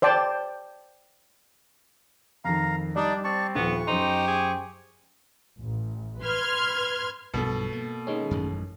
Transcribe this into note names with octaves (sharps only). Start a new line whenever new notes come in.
C5 D5 G5 A5
F2 D#3 F5 A#5
G3 D4 D#4 D5
C4 D5 A5 C#6
D#1 F3 B3 C#6
F#2 D#4 G4 C5 C6
G#4
A1
B4 C6 F6 G#6
B1 G2 B2 F3 A4
A#3
D#3 G#3 C#4
A1 F#2